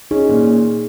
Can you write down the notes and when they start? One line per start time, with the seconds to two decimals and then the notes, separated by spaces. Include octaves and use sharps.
0.11 C#4 D#4 G#4
0.29 A#2